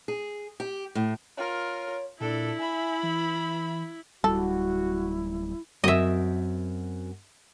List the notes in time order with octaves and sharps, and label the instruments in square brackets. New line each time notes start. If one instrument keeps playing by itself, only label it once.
[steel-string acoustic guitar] G#4
G4
A2
[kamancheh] F4 A#4 [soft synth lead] C#5
[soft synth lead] A#2 [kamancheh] D4 A4 [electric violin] E4
[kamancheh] E5 B5 [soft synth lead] G#5
[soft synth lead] E3
[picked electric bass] D1 G#1 G3 [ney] E4 [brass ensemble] F#4 [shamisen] A4
[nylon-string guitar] F#2 C4 F#4 [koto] D#5 E5